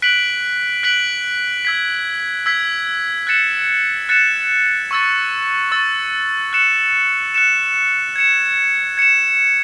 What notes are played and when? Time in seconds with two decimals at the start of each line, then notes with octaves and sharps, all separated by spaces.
0.02 F#6 B6 D7 F#7
0.83 F#6 B6 D7 F#7
1.65 E6 G#6 B6
2.46 E6 G#6 B6
3.27 F#6 A6 C#7 E7
4.09 F#6 A6 C#7 E7
4.91 C#6 E6 A6
5.72 C#6 E6 A6
6.53 F#6 C#7 E7
7.34 F#6 C#7 E7
8.16 G#6 C#7 E7
8.98 G#6 C#7 E7